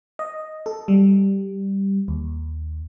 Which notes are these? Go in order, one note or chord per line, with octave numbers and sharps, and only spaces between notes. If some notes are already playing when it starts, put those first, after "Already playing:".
D#5
A4
G3
D#2